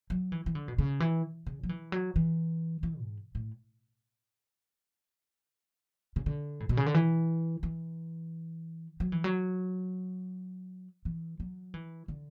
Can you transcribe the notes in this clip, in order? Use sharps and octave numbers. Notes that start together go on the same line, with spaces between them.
F#3
E3
E3
D3
B2
C#3
E3
C#3
F#3
E3
F#3
E3
E3
G#2
A2
C#3
D3
A2
B2
C#3
D3
E3
E3
F#3
E3
F#3
E3
F#3
E3
D3